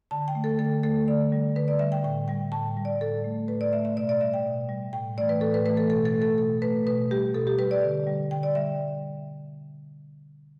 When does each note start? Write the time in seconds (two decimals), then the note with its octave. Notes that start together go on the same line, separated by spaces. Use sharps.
0.11 D3 A5
0.28 G5
0.35 A3
0.44 A4
0.59 D3 A4
0.83 A3 A4
1.08 D3 D5
1.32 G3
1.55 D3 B4
1.68 D5
1.79 G3 E5
1.92 G5
2.04 A2 G5
2.28 G3 G5
2.52 A2 A5
2.77 G3
2.85 D5
3.01 A2 A4
3.24 A3
3.48 A2 B4
3.61 D5
3.73 A3 E5
3.85 E5
3.96 B2 D5
4.09 D5
4.21 G3 E5
4.34 G5
4.45 B2
4.69 G3
4.93 A2 G5
5.18 E3 A3 D5
5.29 B4
5.41 A2 A4
5.54 B4
5.66 E3 A3 B4
5.77 A4
5.89 B2 A4
6.05 A4
6.14 A3
6.22 A4
6.38 B2 A4
6.62 A3 B4
6.86 B2 B4
7.11 G3 G4
7.35 B2 A4
7.47 G4
7.59 G3 B4
7.71 D5
7.83 D3
8.07 G3
8.31 D3 G5
8.43 D5
8.55 G3 E5